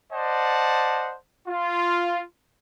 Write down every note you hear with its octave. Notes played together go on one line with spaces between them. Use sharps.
C5 D5 D#5 F#5 A5
F4